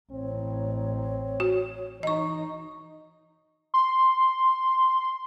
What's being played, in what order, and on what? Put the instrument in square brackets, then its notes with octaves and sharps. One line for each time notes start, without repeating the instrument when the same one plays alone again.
[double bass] A1 [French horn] C4 [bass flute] C#5
[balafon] F#4
[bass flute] E3 [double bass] D#4 [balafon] D#5 C#6
[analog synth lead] C6